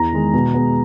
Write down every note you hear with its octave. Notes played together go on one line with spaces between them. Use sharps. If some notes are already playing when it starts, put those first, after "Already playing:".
Already playing: E2 A#5
D#3 G#3
B2
G#3 B3